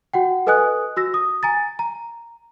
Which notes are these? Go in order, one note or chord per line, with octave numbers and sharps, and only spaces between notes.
F#4 F#5 G5
A4 B4 D#5 G#5 D#6 F#6
F#4 E6 A#6
D#6
G#5 A#5 A6
A#5